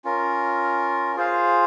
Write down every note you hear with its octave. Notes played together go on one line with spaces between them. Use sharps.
C#4 F4 A#4
F4 G#4 C5 F5